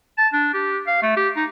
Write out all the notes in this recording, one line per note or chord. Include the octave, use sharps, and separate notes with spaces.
A5
D4
G4
F5
A3
G4
D#4